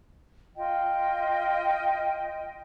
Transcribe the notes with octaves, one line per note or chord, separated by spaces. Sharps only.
F4 D#5 G5